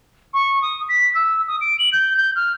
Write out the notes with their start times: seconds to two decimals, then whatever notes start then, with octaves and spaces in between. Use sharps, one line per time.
0.34 C#6
0.62 D#6
0.89 B6
1.15 E6
1.48 D#6
1.61 D7
1.79 F#7
1.93 G6
2.17 G6
2.36 F6